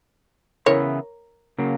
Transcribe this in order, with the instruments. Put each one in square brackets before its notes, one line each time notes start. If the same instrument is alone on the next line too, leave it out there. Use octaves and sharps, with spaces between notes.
[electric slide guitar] C#3 E3 B3 E4 [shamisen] A#4 C#5
[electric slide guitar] C#3 F#3 A#3